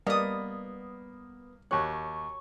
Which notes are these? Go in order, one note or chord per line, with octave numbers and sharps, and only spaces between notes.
G3 A#3 B3 D5 D#5 D#6
D#2 F#4 C#5 F#6